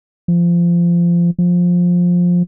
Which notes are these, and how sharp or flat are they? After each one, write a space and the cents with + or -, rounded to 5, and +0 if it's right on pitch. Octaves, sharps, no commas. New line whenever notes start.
F3 -20
F3 +15